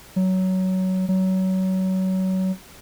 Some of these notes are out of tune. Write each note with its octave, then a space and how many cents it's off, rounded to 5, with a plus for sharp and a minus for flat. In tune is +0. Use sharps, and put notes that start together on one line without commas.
F#3 +15
F#3 +25